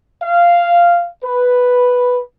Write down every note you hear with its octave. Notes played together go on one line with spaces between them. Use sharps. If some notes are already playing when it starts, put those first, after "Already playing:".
F5
B4